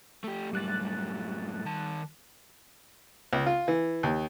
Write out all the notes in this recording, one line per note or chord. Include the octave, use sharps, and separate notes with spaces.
A3 G4
F#2 A2 G3 F#6 A6
D#3 A5
C#2
F4
E3
D#2